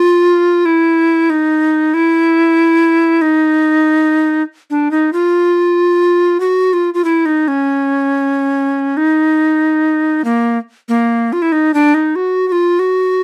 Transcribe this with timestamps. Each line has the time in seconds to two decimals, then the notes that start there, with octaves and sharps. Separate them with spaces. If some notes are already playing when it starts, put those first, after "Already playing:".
Already playing: F4
0.65 E4
1.30 D#4
1.94 E4
3.22 D#4
4.70 D4
4.91 D#4
5.13 F4
6.40 F#4
6.73 F4
6.94 F4
7.04 E4
7.26 D#4
7.48 C#4
8.97 D#4
10.25 A#3
10.89 A#3
11.33 F4
11.42 E4
11.52 D#4
11.74 D4
11.94 D#4
12.16 F#4
12.47 F#4
12.52 F4
12.79 F#4